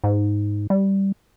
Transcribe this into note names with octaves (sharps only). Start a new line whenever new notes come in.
G#2
G3